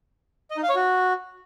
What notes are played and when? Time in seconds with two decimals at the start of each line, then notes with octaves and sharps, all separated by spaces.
0.51 D#5
0.57 D#4
0.63 F5
0.69 C#5
0.75 F#4